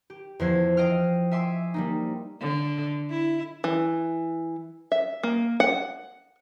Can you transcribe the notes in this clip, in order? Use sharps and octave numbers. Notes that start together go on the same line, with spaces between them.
G4
E2 F3 C5 G#6
D#5 F5 G5 F6
E5 G#5 C6 D6 E6
G3 A#3 D#4
D3
E4
E3
E5
A#3
F#5